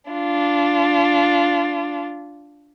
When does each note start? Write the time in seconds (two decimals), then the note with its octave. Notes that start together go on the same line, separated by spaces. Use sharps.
0.11 D4 F4